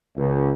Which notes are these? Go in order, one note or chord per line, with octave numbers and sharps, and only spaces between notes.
C#2